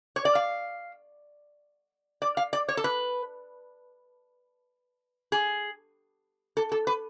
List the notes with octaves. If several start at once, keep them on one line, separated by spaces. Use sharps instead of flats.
C#5
D5
F5
D5
F5
D5
C#5
A4
B4
G#4
A4
A4
B4